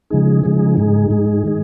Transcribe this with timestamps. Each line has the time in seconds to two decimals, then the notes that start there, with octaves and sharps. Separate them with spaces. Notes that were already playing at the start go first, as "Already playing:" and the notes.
0.10 C#3 F3 G#3 D#4 G#4
0.43 C#3 F3 G#3 D#4 G#4
0.77 G#2 G#3 D#4 G#4
1.10 G#2 G#3 D#4 G#4
1.45 D#3 G#3 D#4 G#4